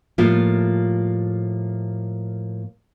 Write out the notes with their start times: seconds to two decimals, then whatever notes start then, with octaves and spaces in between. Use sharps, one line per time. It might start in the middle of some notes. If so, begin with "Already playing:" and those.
0.18 A2 F3 G3 A3 A#3 F4